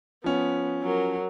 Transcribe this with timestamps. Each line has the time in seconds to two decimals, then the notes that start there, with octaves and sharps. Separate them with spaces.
0.24 F3 B3 C#4
0.82 F#3 A#4